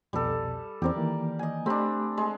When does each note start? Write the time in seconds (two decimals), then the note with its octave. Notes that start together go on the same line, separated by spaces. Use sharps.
0.13 C2 F2 B2 G3 A4
0.82 E2 C4 G4 A#4 D5
0.96 D#3 E3 A#3
1.39 D#5 G#5
1.66 A3 C4 D4 G4 B5
2.18 G#3